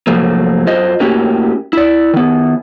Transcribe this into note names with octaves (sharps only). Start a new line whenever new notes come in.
G#2 C3 F3 F#3 A3 A#3
F#2 F4 C5 D#5
A2 A#3 C#4 F#4 G4
E4 D5
D#3 B3